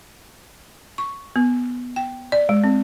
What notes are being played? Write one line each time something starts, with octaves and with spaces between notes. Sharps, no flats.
C#6
B3
G5
D5
G#3
C4